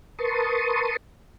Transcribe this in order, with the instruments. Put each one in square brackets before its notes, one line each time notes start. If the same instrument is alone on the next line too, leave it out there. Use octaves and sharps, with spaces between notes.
[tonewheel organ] A#4 B4 A5 C6 C#6 D#6